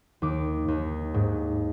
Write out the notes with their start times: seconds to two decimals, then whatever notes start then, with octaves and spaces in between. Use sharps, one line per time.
0.22 D#2 D6
0.68 D#2
1.14 G#2